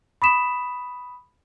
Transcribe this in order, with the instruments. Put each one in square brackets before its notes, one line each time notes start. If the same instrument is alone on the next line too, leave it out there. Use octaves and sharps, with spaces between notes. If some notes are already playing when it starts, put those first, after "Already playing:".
[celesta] B5 C#6 D#6 B6 E7